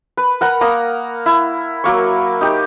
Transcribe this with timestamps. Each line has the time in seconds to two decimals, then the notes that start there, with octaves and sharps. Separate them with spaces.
0.17 B4
0.41 A#4 F#5 A#5 B5
0.61 A#3 A#5 D#6
1.26 E4
1.84 F#3 A#3 C#6
2.41 D#4 G4